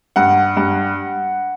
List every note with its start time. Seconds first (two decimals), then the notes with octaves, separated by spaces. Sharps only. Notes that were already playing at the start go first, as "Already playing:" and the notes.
0.16 G2 F#5
0.57 G2